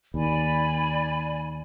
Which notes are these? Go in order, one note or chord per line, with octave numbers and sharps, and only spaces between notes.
D#2 D5 G#5 B5